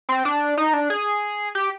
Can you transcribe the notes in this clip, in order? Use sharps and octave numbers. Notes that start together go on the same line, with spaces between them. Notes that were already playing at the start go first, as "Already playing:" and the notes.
C4
D4
D#4
D4
G#4
G4